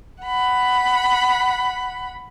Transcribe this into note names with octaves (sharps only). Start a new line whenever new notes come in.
F#5 B5